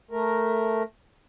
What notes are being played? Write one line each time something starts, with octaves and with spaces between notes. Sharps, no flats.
A3 A#4